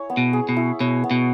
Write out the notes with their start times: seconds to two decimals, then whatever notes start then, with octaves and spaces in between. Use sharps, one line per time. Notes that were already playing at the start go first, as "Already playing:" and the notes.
Already playing: E4 G#4 C#5
0.10 B3
0.17 B2
0.33 G#4
0.49 B2
0.56 E4
0.80 B2 C#5
1.04 B3
1.11 B2